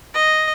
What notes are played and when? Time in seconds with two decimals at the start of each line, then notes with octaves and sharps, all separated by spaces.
0.15 D#5